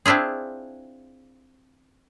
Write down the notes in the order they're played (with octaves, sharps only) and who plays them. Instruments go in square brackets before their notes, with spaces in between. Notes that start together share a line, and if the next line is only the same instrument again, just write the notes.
[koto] C4 D4 E4 F4 G#4